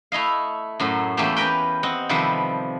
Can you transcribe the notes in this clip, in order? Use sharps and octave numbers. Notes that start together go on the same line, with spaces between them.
A3 E4 D#5 F5
F#2 A2 F#3
E2 A3 A#3 C#4 G4 A5
C#4 G4 A#4 B4 G5
C4 D#5 F#5
C3 D#3 F3 G3 A4 B4